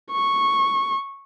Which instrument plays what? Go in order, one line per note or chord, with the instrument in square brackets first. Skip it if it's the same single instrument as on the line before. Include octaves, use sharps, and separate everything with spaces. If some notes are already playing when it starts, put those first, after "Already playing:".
[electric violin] C#6